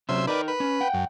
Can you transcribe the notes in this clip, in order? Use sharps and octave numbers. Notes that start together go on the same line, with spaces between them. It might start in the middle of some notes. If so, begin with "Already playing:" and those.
C3 F#3 C#4 C5 E5
D#4 A#4 B4 D5
B4
C#4
F#5 G5
F#2